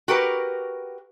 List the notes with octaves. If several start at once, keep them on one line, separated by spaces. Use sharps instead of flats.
F#4 G4 A#4 B4